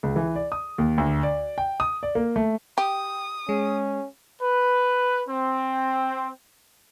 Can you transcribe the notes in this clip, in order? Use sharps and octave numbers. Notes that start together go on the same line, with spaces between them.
C#2
E3
D5
D#6
D#2
D2
D5
G5
D#6
D5
A#3
A3
G4 G5 D#6
G#3 C#4
B4
C4